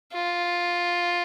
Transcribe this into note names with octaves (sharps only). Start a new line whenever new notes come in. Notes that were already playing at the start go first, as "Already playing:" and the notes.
F4